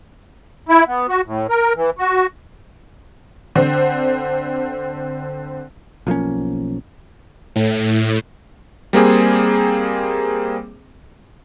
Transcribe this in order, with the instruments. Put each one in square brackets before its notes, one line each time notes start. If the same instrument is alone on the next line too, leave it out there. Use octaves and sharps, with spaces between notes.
[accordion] E4
B3
F#4
A2
A#4
E3
F#4
[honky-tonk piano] D3 C4
[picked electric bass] B1 F3 A#3 C#4
[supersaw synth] A2
[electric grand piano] G3 A#3 C4 G#4